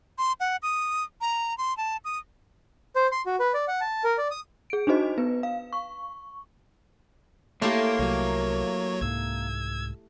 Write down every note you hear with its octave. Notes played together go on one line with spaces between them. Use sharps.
C6
F#5
D#6
A#5
C6
A5
D#6
C5
C6
F#4
B4
D5
F#5
A5
A#4
D5
D#6
G#4 D7
D4 D#4 F#4 C5 D#5
B3 B4
F5
C#6
A3 A#3 E4 G4 C#5 C6
C2 F#3 C#5
C2 G#2 E6 G#6